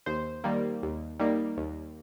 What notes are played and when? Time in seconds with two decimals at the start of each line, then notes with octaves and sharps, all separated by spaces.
0.06 D#2 C5
0.44 D#3 G3 A#3
0.82 D#2
1.19 D#3 G3 A#3
1.57 D#2